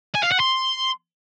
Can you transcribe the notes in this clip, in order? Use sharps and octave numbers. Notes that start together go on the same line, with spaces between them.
G#5
F5
F#5
C6